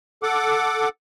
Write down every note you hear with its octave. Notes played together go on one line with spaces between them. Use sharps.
A4 F#5 D6